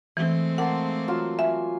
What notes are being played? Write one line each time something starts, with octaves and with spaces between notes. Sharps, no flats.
E3 G#3 A3 C4
A#3 F#5 A5 C6
F#3 F4 E6
E5 G#5